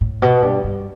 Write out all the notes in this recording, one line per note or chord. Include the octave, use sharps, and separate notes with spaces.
A2
B2
G2
G2